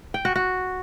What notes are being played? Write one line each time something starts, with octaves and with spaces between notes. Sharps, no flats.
G5
F#4
F#4